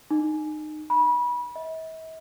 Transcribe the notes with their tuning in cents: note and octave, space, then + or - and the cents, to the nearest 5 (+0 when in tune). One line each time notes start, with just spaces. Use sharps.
D#4 -25
B5 -25
E5 -45